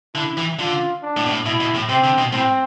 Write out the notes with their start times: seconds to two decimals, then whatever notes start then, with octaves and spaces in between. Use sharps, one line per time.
0.15 D3 E4
0.37 E3
0.59 D3 F4
1.02 D4
1.17 A2
1.26 B2
1.32 A2
1.46 B2 E4
1.60 B2
1.75 A2
1.89 C3 C4
2.04 D3
2.18 B2
2.32 A2 C4